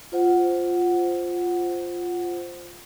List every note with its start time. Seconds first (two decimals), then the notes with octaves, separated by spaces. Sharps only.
0.12 F4 C5 F#5